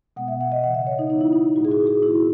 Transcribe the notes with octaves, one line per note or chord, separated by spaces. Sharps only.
B2 G#3 B3 F#5
E5
F#5
D#5
C#3 E3 B3 F#5
E5
C#5
D#4
B2 G#3 B3 D#4
E4
D#4
A2 G#3 B3 F#4
G#4
F#4
G#4
D#3 G#3 B3 E4